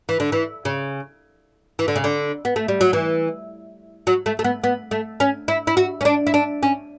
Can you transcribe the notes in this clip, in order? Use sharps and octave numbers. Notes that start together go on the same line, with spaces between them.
E3
D3
E3
C#3
E3
D3
C#3
D3
B3
A3
G3
F#3
E3
F#3
A3
A3
B3
B3
A3
C#4
E4
E4
F#4
C#4
D4
E4
D4
C#4